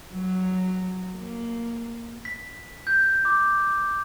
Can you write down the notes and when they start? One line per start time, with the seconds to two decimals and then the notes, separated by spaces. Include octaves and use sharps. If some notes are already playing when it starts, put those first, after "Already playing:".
0.11 F#3
1.16 A#3
2.25 B6
2.87 G6
3.25 D6